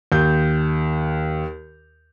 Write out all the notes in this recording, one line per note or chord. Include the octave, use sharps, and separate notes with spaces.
D#2 G6